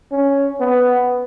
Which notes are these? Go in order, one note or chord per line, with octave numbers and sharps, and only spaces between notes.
C#4
B3